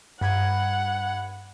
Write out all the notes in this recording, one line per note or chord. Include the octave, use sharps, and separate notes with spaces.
G2 F#5 B5 G#6